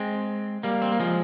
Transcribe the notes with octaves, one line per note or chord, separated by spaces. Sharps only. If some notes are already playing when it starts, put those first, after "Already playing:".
Already playing: G#3 C4
G3 A#3
C4
A#3
F3 G#3